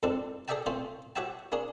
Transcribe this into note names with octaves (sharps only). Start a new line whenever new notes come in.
F2 G#2 C4 D4 A4
G#4 A4 D5 E5 G5 A5
A3 C4 C#4 F4 C5
F#4 G4 C#5 E5 G5 A5
A#3 C#4 D4 G#4